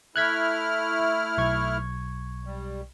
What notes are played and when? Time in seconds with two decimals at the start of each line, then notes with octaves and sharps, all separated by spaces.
0.16 A3 E4 F6 F#6 G#6 B6
1.38 B1 C#6 G#6
2.46 G3